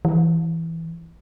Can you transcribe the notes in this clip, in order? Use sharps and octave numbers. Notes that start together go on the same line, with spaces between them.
E3